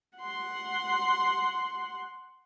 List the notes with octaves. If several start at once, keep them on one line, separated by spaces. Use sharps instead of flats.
F#5 C6